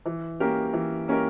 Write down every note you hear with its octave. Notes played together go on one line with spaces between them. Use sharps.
E3
A#3 C#4 G4 A#4
E3
A#3 C#4 G4 A#4